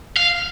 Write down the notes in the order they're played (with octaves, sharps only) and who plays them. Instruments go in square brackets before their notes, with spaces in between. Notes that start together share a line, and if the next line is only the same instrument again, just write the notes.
[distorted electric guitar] F5